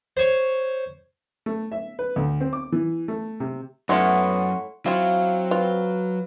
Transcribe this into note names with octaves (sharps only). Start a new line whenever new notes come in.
C5 C#5
A3
E5
B4
D2
C4
D6
E3
A3
C3
F#2 A3 B3 C#4 E4 F#5 C6 C#6
F#3 C4 E4 F4 F5
F4 B4